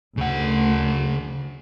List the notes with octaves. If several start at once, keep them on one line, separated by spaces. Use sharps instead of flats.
D2 C#3 F#5